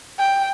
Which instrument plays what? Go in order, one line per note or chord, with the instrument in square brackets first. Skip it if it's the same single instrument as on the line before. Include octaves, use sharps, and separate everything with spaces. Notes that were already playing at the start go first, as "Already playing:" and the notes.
[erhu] G5